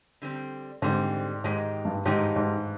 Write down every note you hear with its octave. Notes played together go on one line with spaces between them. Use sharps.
D3 G3 C4
G#2 D3 G3 C4
G#2 D#3 G#3 D#4 G4
G2
G#2 D#3 G#3 D#4 G4
G#2